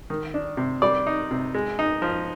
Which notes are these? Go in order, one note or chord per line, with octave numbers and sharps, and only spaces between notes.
D#3
D4
C3
G3 D5
D#4
C3
G#3
D#4
F3